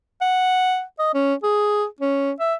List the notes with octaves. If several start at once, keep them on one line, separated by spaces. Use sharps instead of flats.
F#5
D#5
C#4
G#4
C#4
E5